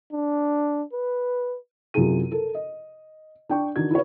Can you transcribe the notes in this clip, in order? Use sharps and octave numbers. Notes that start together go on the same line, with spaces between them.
D4
B4
F#2 C3 E4 F4 G#4 D#7
A4 A#4
D#5
D4 G5 C#6
D#3 E3 D4 D#4 F#4 G#6
E4 F#4 B4 C#5